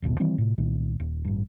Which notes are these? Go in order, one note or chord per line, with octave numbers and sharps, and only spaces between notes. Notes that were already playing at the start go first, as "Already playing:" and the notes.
D#1 A1 D#2 B2
D#3 E3 G3 C4
A2 C3
C2 A#2 D#3
D#1
A1 G2